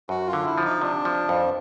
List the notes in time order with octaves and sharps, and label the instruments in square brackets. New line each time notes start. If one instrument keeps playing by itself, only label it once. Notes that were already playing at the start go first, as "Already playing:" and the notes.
[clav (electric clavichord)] F#2 [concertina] F#4
[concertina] F4
[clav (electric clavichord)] D3
[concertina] E4
[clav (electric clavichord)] F3
[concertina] D#4
[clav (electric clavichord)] C3 [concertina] D4
[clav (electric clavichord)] F3
F2